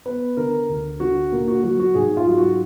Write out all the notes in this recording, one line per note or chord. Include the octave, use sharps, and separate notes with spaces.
B3 B4
D3 A#4
D2
D3 F#4
A#2 A#4
F#4
F#3 F#4
F#4
G#2 G#4
F4
F#3
F#4